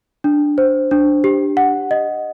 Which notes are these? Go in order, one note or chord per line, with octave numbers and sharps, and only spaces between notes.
D4
C5
D4
G4
F#5
D#5